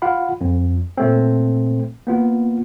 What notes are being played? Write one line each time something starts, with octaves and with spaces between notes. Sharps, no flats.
F4 F5 F#5 B5
F2
A#2 A3 C4
A#3 B3 F4